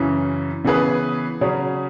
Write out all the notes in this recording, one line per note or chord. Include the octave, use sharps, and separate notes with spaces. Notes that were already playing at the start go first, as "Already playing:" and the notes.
Already playing: F#2 C#3 E3
C#3 E3 B3 G#4 B4
C#3 F#3 C#4 G#4